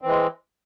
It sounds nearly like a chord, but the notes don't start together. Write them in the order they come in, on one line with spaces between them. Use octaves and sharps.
C4 E3 G#3